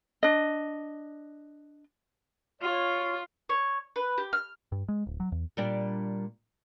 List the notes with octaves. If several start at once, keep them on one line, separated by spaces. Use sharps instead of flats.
D4 D#5
F4 C#5
C#5
B4
G4
F6
G2
G#3
D1
F#3
E2
A#2 G3 D4